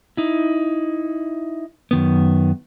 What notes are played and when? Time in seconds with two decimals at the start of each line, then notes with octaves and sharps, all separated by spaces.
0.17 D#4 E4
1.91 F#2 D#3 B3